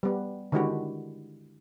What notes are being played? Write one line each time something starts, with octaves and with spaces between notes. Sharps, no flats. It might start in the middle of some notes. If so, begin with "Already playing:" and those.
G3 B3
D3 D#3 G#3 E4 F#4 G4